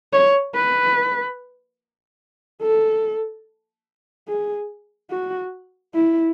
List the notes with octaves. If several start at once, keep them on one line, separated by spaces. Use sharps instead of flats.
C#5
B4
A4
G#4
F#4
E4